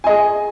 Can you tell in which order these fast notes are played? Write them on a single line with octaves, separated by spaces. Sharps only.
G#5 D#5 G#4